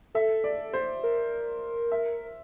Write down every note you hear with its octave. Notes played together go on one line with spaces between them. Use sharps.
A4 E5
D5
C5
A#4
E5